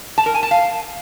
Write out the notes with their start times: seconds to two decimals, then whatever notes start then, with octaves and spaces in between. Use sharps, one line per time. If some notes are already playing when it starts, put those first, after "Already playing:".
0.18 A5
0.26 A#4
0.34 G#5
0.43 A5
0.51 F5